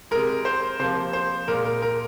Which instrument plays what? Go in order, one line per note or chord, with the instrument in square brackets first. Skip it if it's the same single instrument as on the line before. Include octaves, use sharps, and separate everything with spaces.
[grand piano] C3 G#3 A#4
C5
C3 F3 A#3 C5
C5
A#2 G#3 A#4
A#4
A#4